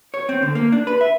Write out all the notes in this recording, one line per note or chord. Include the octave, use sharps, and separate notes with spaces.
C#5
C4
D3
A#3
D4
B4
E5